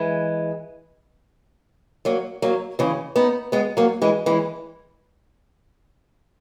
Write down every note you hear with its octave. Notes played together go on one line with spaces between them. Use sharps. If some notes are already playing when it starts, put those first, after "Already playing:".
Already playing: E3 G#3
F#3 A#3
F#3 A#3
C#3 E3
B3 D#4
G#3 B3
F#3 A#3
E3 G#3
E3 G#3